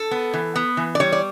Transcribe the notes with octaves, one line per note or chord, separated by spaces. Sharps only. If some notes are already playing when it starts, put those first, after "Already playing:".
Already playing: A4
B3
E3
B3
E3
D5
G3 C#5
D5